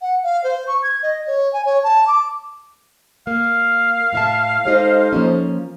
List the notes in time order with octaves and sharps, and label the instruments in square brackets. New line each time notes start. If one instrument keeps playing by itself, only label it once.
[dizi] F#5
F5
C5
C#6
G#6
D#5
C#5
G#5
C#5
A5
D6
[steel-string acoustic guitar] A#3 [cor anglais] F5
[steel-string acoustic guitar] A2 E5 A5
[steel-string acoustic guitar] G#3 G4 D#5 [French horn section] D#4 A4 C5
[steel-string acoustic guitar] F3 A#3 C#4